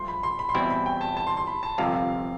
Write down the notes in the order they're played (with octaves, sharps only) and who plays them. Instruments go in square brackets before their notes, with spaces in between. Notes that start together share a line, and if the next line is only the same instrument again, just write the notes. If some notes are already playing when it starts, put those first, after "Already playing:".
Already playing: [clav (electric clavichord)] G2 F3 A3 [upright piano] C6
[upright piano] B5
C6
B5
C6
[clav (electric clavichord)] E2 B2 G3 C4 E4 [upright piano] B5
[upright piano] B5
G5
A5
A5
C6
C6
B5
A5
[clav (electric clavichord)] G1 F2 C3 [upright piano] F5
[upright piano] F5